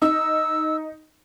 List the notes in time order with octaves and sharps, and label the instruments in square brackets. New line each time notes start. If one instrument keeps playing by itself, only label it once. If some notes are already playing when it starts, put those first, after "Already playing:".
[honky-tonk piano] D#4 [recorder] E6